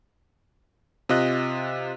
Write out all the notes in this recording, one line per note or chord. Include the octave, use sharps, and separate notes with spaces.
C3 F4 D#5 F#6